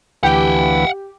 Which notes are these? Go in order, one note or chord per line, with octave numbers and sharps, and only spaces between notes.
D2 E3 G4 B4 F#5 G5